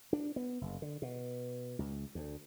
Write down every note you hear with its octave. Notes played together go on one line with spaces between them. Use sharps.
D4
B3
F#1
D3
B2
C#2
D2